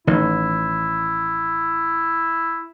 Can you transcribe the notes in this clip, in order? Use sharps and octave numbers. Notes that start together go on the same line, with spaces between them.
A1 D#3 E4